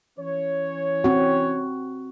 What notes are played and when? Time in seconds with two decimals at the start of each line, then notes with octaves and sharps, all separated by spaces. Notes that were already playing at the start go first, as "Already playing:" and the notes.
0.19 E3 C#4 C#5
1.04 C4 F#4